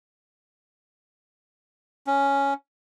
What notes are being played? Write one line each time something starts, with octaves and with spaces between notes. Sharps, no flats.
C#4